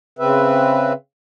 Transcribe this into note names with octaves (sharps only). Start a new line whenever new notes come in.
C#3 C4 B4 E5